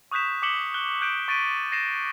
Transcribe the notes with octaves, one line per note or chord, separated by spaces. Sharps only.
C#6 D#6 F#6 G6 B6 E7
D6 B6 C#7 E7 F#7 G7
F#6 G7
F#6 G6 D7 E7
C#6 A6 B6 D7 D#7
A6 A#6 C7 D#7 E7